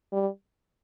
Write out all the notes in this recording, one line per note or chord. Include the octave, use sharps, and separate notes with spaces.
G3